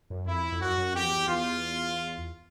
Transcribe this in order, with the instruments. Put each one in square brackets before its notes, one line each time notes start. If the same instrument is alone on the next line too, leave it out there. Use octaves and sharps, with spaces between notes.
[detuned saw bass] F#2
[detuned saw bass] F2 [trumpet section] E4
[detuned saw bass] F2
[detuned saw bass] F#2 [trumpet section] F#4
[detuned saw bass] F#2
[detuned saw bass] F2 [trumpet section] G4
[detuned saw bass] E2
E2
[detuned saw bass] E2 [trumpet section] F4